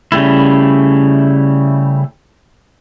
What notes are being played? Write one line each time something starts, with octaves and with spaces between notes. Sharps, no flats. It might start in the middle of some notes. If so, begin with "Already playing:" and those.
C#3 G3 A3 E4